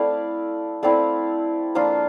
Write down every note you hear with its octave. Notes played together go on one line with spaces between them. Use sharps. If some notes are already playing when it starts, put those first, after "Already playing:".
Already playing: A3 C4 E4 D5 F5
A3 C4 E4 D5 F5
F3 A#3 D4 F4